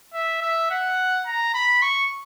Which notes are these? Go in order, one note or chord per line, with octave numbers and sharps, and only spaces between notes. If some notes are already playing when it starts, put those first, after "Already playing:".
E5
E5
F#5
A#5
B5
C#6